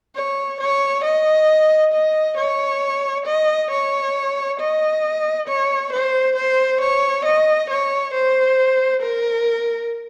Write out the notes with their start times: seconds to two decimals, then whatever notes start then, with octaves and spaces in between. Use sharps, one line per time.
0.16 C#5
0.61 C#5
1.04 D#5
1.94 D#5
2.38 C#5
3.26 D#5
3.71 C#5
4.60 D#5
5.48 C#5
5.93 C5
6.36 C5
6.81 C#5
7.25 D#5
7.70 C#5
8.14 C5
9.02 A#4